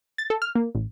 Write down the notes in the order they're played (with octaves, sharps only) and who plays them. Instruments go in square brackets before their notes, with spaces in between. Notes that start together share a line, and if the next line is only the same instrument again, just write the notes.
[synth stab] A6
A4
F6
A#3
A1